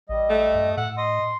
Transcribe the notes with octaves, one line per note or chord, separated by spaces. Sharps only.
A1 G3 D#5
A3
F#2
A2 F#5 E6
D#5 C6